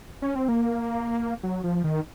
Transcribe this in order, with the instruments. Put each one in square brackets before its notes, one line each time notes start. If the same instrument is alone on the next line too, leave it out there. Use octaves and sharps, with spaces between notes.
[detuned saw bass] C#4
C4
A#3
F#3
F3
D#3